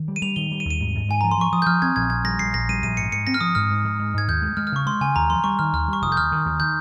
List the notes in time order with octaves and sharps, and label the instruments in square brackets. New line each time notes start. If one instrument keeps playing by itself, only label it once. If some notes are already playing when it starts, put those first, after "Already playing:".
Already playing: [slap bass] D#3
G3
[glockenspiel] D#7
[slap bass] G3 [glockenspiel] F7
[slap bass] D#3 [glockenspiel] G7
[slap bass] G3
[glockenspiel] D#7
[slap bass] D#2
[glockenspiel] D#7
[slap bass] G#2
G#2
[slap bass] G#2 [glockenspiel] G#5
[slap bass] F3 [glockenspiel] A#5
[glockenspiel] C6
[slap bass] F3 [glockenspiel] C#6
[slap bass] F3 [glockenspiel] D#6
[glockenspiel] G6
[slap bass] F3 [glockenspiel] F6
[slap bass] C4 [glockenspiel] G#6
[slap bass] A#1 [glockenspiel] G#6
[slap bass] A#1 [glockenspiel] G#6
[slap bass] G3 [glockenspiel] A#6
[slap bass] A#1 [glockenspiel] C7
[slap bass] A#1 [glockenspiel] A#6
[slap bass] G3 [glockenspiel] D#7
[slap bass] A#1 [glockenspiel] D#7
[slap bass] G#2 [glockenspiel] C#7
[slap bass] G#2 [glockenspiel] C#7
[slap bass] C4 [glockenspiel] A#6
[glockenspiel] F6
[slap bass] F3 [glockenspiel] D#6
[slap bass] G#2 [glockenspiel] F6
[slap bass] G#2
G#2
G#2
[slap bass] G#2 [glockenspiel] G#6
[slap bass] D#2 [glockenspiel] G6
[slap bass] G#3
[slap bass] G#3 [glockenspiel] F6
[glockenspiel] F6
[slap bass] C#3 [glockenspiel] C#6
[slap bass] G#3 [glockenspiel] C6
[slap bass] C#3 [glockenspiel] G#5
[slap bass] D#2 [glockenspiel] A#5
[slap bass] F3 [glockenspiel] C6
[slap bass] G3 [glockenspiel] C#6
[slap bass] D#3 [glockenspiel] F6
[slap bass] D#2 [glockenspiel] F6
[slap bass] G3 [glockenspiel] C#6
[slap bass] F1 [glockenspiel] D#6
[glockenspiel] G6
[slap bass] D#2 [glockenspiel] F6
[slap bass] D#3
D#2
[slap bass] D#3 [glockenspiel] G6